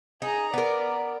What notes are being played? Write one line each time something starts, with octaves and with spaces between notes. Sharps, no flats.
D#4 G#4 A#5
B3 A#4 D5